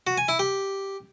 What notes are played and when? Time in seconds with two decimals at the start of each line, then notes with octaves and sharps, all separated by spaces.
0.07 F#4
0.18 G#5
0.28 E4
0.39 G4